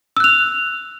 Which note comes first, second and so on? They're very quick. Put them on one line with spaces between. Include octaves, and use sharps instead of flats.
E6 F#6 F7